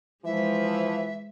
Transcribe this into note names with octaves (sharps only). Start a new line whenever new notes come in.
E3 F3 G#3 E5